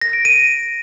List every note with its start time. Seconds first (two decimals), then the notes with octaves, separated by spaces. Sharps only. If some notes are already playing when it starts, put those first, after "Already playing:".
0.01 A#6
0.13 D7
0.25 D#7